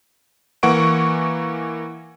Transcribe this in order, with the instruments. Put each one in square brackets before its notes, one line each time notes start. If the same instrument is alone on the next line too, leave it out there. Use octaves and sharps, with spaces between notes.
[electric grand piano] E3 A#3 F#5 C#6 D7